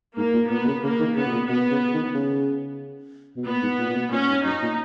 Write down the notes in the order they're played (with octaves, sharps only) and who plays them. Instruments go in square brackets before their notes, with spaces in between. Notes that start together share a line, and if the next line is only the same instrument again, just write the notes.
[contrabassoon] G#2 [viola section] A#3
[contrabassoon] A#2
[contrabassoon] A#2 [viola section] B3
[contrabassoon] B2
C#3
[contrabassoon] C#3 [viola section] A#3
[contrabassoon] D#3
[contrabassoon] C#3 [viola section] B3
[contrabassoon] B2
A#2
[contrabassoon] B2 [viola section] B3
[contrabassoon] C#3
D#3
C#3
B2
[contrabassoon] A#2 [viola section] B3
[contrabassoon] G#2
A#2
A#2
B2
[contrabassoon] A#2 [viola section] C#4
[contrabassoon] G#2
[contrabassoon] F#2 [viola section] D#4
[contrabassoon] A#2